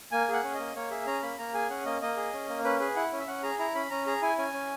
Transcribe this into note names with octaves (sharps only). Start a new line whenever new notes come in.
A#3 G#5
G#4 F#5
C#4
A#3 D#5
A#3 C#5
G#4 E5
C#4 A#5
A#3 B5
A#3 A#5
G#4 G#5
C#4 F#5
A#3 D#5
A#3 D#5
G#4
C#4
A#3
C#4 B4
G#4 B4
E4 F#5
C#4
E5
C#4 F#5
G#4 A#5
E4 A#5
C#4 B5
C#4 A#5
G#4 A#5
E4 G#5
C#4 G#5
C#4